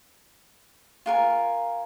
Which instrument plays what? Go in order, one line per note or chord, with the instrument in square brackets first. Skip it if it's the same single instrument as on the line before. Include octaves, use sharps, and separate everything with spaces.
[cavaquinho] F4 A#4 G#5